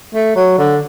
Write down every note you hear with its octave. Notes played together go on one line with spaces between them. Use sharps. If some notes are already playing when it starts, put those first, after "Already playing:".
A3
F#3
D3